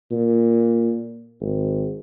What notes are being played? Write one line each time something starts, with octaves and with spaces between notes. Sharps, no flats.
A#2
G#1